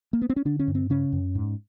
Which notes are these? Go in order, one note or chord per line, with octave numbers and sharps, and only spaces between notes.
A#3
B3
C4
C#4
D3 D4
C#4
G2
C4
C#3 C#4
F#2
G#2